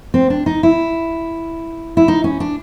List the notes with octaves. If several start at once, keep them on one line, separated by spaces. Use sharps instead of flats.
C4
D4
D#4
E4
E4
D#4
C#4
D4